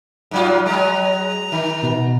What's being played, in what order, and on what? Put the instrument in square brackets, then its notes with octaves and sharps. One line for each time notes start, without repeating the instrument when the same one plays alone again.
[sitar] G#2 F#3 F4
[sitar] F#3 G#3 [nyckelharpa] A#5
[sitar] D#3
[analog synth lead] B2